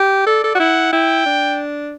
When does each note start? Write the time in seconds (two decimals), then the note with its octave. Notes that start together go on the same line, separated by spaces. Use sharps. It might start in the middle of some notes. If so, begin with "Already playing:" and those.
Already playing: G4
0.26 A4 D5
0.44 A4
0.55 F#4
0.59 E4 F#5
0.93 E4 G5
1.26 D4